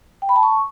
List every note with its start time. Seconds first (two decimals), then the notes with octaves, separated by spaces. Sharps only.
0.22 G5
0.29 B5
0.36 A5
0.43 C#6